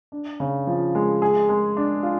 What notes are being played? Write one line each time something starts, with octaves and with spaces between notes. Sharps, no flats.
D4
C#3
F3
G#3
G#4
G#3
D4
F4